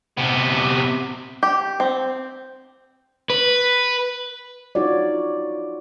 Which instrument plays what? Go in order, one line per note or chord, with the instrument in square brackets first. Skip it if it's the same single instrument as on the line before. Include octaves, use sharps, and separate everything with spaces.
[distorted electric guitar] C3 B3
[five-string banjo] G4
C4
[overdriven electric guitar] B4
[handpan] D#4 F4 F#4 C#5 D5